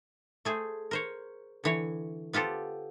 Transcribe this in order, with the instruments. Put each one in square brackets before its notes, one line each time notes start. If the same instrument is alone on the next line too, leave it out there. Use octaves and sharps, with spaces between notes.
[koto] A3 G#4 C5
A#4 C5 C#5
D3 E3 C#5
B3 F4 G4 A4 C5